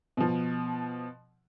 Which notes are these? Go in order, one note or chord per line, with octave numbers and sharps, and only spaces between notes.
B2 F3